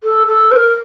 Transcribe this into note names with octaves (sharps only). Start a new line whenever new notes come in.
A4
A4
C5
A#4